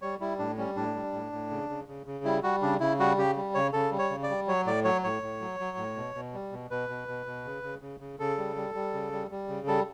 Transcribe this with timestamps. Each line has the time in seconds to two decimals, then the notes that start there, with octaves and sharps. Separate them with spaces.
0.02 G3 C#5
0.20 G3 E4
0.39 A2 D4
0.58 G3 C#4
0.76 A2 D4
0.95 G3
1.13 A2
1.33 A2
1.51 C#3
1.70 C#3
1.88 C#3
2.06 C#3
2.25 G3 E4
2.43 G3 F#4
2.62 C#3 D4
2.80 C#3 E4
2.99 G3 F#4
3.18 C#3 G4
3.37 G3
3.54 C#3 C#5
3.73 C#3 A4
3.92 G3
3.99 C#5
4.10 C#3
4.23 D5
4.30 G3
4.47 F#3 C#5
4.66 A2 D5
4.84 F#3 C#5
5.04 A2 C#5
5.23 A2
5.41 F#3
5.60 F#3
5.77 A2
5.96 B2
6.15 B2
6.34 G3
6.52 B2
6.71 B2 B4
6.89 B2
7.08 B2
7.26 B2
7.45 C#3
7.63 C#3
7.81 C#3
8.00 C#3
8.19 C#3 A4
8.38 G3
8.56 G3
8.75 G3
8.94 C#3
9.12 G3
9.31 G3
9.48 C#3
9.67 G3 A4